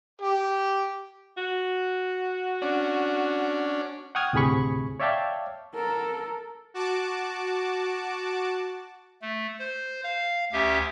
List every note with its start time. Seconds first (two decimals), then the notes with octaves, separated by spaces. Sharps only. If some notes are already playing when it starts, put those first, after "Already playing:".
0.21 G4
1.37 F#4
2.62 C#4 D4
4.15 F#5 G5 C#6 D#6 F6 G#6
4.33 D2 A2 C3 G#4 B5 C#6
5.00 C#5 D5 E5 F5 G5 A5
5.74 A4 A#4
6.74 F#4 A5 D6
9.22 A3
9.59 C5
10.03 F5
10.53 D2 C#4 G4 E5